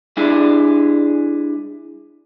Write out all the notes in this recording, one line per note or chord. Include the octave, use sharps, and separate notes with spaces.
G3 D4 E4 G#4 D5